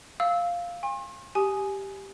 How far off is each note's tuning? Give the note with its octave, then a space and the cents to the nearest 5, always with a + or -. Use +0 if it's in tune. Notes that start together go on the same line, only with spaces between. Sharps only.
F5 +0 E6 -15
G#5 -45 C6 +45
G4 +0 G#5 +10 D#6 +0